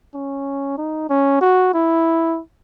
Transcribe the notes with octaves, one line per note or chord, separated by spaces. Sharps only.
C#4
D#4
C#4
F#4
E4